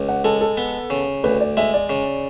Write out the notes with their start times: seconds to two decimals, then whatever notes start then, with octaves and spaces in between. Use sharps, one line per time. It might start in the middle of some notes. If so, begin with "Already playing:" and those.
Already playing: C#2
0.09 F#5
0.24 G#3 A4
0.41 A4
0.57 B3
0.90 C#3
1.24 D2 B4
1.41 D5
1.57 G#3 E5
1.74 D5
1.89 C#3